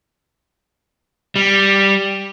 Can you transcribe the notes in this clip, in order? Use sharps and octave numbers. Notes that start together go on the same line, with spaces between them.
G3